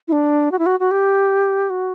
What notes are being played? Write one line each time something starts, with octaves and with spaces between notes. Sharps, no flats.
E4
D4
F#4
E4
F#4
F#4
G4
F#4